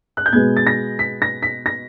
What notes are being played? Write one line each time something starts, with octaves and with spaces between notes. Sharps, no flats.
F#6
G6
B2 G#3 B3 G#6
A6
A#6
B6
A#6
B6
A#6